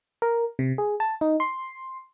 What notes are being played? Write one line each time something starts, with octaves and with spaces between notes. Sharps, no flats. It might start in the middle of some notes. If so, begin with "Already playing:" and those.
A#4
C3
G#4
A5
D#4
C6